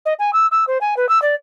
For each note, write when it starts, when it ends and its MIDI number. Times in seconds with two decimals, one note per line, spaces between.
0.05 0.14 75
0.19 0.31 80
0.33 0.46 88
0.51 0.64 88
0.67 0.78 72
0.81 0.94 80
0.97 1.08 71
1.09 1.21 88
1.22 1.35 74